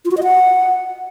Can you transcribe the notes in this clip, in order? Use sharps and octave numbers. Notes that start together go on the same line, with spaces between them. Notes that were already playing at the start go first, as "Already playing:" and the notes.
F4
F#4
D#5
F#5